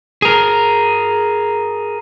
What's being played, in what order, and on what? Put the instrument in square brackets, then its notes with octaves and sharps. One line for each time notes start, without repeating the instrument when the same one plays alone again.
[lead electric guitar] G#4 A#4